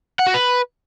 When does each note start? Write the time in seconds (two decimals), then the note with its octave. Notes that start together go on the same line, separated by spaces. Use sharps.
0.19 F#5
0.27 F#4
0.34 B4